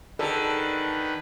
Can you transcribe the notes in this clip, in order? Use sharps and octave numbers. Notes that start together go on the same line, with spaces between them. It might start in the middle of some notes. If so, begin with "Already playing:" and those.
D3 D#3 D#4 G#4 A4 B4